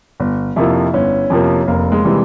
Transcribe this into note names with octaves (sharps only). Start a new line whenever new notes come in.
G1
F2 C3 F3 A#3 E4
G1 C#4
F2 C3 F3 A#3
F1 A#3
G#3
C3 E3 G3